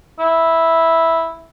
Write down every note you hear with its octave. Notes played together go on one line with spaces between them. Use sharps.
E4